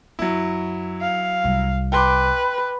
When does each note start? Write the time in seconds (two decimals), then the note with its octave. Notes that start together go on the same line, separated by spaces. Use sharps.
0.19 F#2 F#3 E4
1.01 F5
1.44 C2 G3
1.92 B4 G5 C6 D6